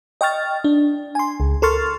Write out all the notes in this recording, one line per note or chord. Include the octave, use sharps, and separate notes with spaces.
D#5 G5 C#6 F6 A6
D4
G#5 C6
C#2
A4 A#4 C6 C#6 F6 A6